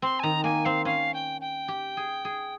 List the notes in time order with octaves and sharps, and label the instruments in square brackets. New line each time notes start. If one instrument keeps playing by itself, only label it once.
[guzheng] C4 [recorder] C6
[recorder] G#5
[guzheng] D#3 [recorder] A#5
[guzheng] A#3 [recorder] G#5
[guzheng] C4 [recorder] F5
[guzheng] C#4 [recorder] F5
[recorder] G5
G5
[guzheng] G4
G#4
G#4